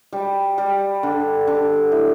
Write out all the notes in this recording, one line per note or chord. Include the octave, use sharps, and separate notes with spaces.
G3
G3
D3
D3
E4